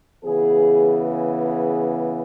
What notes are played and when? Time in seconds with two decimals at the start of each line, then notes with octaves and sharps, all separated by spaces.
0.24 C#3 E3 B3 G#4
1.46 G#4